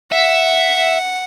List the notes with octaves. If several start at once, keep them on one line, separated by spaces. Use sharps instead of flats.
E5 F#5